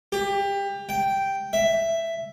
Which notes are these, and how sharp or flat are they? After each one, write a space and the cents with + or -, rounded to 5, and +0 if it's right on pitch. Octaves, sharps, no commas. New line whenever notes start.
G4 +25
G5 -5
E5 +5